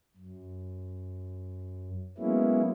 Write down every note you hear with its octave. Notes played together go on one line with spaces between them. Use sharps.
F#2
F#3 G#3 A#3 B3 C#4 E4